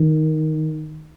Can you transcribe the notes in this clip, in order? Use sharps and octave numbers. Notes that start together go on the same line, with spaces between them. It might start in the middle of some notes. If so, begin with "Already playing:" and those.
Already playing: D#3